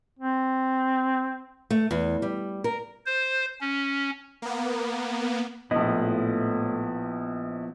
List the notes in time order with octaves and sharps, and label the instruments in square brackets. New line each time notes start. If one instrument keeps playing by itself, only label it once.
[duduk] C4
[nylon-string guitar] A3
E2
G3
A#4
[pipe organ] C5
C#4
[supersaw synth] A#3 B3
[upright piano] A#1 D#5 [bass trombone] A2 [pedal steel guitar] F3 B3 E4